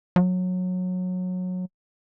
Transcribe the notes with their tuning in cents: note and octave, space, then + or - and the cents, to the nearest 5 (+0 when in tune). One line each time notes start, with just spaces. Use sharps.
F#3 -20